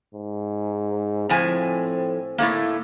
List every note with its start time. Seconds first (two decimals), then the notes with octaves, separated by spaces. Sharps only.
0.14 G#2
1.29 A2 F3 C4 G#5
2.38 A2 A3 A#3